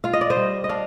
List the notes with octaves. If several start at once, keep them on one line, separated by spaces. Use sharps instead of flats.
F4 F5
D#5
D5
C5 D#5
G3
D#5
D4 D5 F5